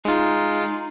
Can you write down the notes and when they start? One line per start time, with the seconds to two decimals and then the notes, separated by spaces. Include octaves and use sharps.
0.05 G#3 D#4 F4